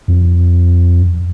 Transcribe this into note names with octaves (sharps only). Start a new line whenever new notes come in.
F2